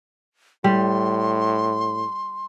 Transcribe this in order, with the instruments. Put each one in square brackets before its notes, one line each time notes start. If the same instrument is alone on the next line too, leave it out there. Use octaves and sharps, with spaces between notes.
[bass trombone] A2 [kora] G3 [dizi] C6